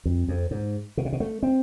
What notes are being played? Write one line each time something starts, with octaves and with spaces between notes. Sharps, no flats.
F2
F2
G#2
B2
C3
B2
A3
C4